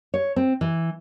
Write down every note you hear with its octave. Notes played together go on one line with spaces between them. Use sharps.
C#5
C4
E3